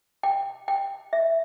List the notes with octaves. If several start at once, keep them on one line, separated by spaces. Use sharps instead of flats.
G5
G5
E5